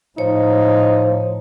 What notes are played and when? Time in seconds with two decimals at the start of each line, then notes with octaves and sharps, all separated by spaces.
0.18 A2 F3 D#4 C#5